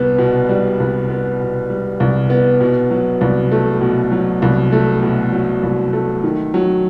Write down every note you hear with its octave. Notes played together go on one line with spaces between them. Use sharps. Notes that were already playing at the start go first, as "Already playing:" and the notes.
Already playing: C2 B2 G3 B3
B2
G3
C2
B3
B2
G3
C2
B3
B2
F#3
C2
A3
B2
F#3
C2
A3
B2
F#3
C2
A3
D#3
F#3